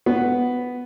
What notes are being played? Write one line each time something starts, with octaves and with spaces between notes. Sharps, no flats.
B3